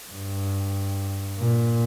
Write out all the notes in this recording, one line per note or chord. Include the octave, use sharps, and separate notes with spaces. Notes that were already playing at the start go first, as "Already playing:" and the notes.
G2
A#2